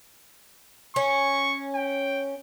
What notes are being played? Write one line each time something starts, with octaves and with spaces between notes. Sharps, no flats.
C#4 C#6
G5